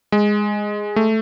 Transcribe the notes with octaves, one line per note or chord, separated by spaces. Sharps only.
G#3
A3